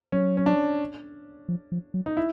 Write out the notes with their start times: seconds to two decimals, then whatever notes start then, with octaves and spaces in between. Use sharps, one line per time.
0.12 F#3 C#4
0.37 C#4
0.46 D4
1.49 F3
1.72 F3
1.94 F#3
2.06 D#4
2.17 E4